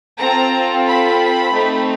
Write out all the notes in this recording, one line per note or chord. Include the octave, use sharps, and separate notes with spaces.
C4 F4 A4 A#5
B5
A3 C4 D#4